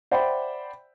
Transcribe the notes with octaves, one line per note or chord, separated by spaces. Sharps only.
C5 D5 E5 F#5 G5 B5